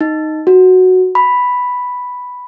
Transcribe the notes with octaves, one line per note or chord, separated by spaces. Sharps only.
D#4
F#4
B5